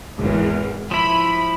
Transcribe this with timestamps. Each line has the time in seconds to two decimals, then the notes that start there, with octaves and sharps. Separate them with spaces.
0.16 G#1 E2
0.91 F3 E4 B5